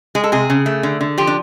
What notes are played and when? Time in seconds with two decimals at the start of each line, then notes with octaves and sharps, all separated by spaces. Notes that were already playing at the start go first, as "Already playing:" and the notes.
0.15 G#3 G#4
0.24 A4
0.32 C3 G#4
0.50 C#3
0.66 A3
0.83 D3
1.01 D3
1.18 F3 G4
1.27 D4